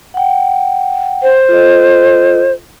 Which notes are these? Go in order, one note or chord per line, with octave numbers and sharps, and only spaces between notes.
F#5 G5
C5
F4 A4 D#5